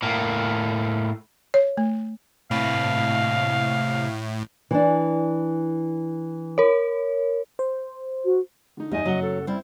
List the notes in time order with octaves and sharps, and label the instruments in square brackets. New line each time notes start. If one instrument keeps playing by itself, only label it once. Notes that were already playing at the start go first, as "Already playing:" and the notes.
[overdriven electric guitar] A2 A#3
[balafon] C#5
A3
[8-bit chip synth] A2 [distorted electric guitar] C3 B4 [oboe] F5
[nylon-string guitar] E3 D4
[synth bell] A#4 C#5
[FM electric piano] C5
[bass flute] F#4
[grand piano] D3 D#4
[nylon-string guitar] E2 [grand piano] G2 D#4 G#5 [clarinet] D#5
[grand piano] F#1 F#5 G7 [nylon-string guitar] F#3
[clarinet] A4
[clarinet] G3 [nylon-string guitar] C4 E4